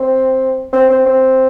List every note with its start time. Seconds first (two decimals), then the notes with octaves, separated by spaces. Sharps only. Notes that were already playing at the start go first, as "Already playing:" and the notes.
Already playing: C4
0.73 C4
0.90 C4
1.06 C4